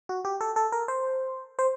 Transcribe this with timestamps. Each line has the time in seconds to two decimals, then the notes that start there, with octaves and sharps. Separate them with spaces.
0.09 F#4
0.25 G4
0.41 A4
0.56 A4
0.72 A#4
0.88 C5
1.59 C5